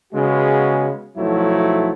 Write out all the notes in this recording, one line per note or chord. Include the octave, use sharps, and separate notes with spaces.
C#3 G#3 B3 F#4
B1 F3 F#3 A3 E4